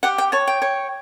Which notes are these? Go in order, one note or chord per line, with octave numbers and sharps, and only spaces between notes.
G4 F#5
G5
C#5 A5
G5
C#5